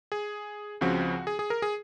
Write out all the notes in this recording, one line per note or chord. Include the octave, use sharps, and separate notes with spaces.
G#4
C#2 C#3 F3 C4 F#4
G#4
G#4
A#4
G#4